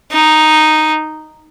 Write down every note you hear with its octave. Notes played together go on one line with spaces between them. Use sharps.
D#4